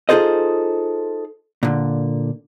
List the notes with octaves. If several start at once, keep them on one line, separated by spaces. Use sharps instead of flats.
D#4 F4 G#4 A4 C5 D#5
A#2 D3